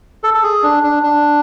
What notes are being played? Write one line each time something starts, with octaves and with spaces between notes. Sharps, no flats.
A4
A4
G#4
D4
D4
D4